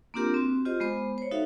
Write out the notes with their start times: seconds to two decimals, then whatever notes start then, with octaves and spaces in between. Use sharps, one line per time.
0.14 A#3 C4 D4 F4 G4 A#4
0.34 C4 F#4
0.65 F4 G4 C5 D#5
0.80 G#3 B3 C5
1.18 C5 C#5
1.31 D#4 F#4 A4 E5 F5